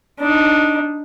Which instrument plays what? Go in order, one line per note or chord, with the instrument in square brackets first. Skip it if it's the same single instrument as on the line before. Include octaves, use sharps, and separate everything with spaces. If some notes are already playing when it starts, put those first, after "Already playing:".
[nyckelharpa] D4 D#4